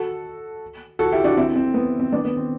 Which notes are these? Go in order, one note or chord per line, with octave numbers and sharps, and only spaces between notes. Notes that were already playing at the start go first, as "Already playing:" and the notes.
Already playing: F#4 A4
F#4 A4
E4 G4
D4 F#4
C4 E4
C4
B3
C4
B3 D4
B3
C4